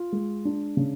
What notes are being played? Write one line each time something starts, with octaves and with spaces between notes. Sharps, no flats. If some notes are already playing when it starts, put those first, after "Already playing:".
Already playing: F4
G#3
D4
C#3